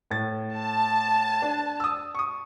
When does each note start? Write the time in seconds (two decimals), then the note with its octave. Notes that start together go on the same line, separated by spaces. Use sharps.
0.11 A2 A6
0.57 A5
1.42 D4
1.80 D#6 E6
2.15 C#6 D#6